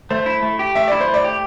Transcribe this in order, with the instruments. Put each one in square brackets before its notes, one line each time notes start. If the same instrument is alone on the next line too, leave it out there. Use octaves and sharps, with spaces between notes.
[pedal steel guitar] A3 [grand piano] C5
[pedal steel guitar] E4
A3
G4
[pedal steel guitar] A3 [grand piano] E5
[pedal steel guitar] E4 [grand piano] D5
[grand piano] C5
[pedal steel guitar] A3
[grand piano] D5
[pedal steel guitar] G4